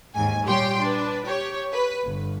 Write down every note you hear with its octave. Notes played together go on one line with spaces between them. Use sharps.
D#2 G#2 G#5
A#2 G3 G4 C#5 G5 C6
D4 B4
G4 C#5
B4
G1